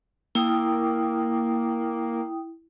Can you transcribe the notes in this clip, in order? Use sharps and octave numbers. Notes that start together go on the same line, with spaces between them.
A#3 E4 G5 D#6